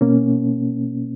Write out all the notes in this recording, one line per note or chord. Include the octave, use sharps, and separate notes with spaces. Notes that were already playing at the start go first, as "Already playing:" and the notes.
B2 A#3 C#4